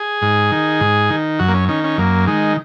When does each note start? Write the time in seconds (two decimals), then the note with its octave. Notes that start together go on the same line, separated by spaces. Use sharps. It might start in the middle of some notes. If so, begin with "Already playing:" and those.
Already playing: G#4
0.22 G#2
0.51 D#3
0.81 G#2
1.10 D#3
1.39 F#2 F#4
1.48 A#3
1.54 C#4
1.69 D#3 C#4
1.84 C#4
1.98 F#2 A#3
2.27 D#3 G#3